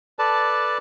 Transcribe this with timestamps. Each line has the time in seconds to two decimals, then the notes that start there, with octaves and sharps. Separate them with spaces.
0.19 A4 B4 D5 A5